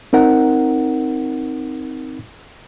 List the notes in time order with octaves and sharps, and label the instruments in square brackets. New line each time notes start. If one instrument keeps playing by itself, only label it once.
[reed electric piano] C4 D#4 A#4 F#5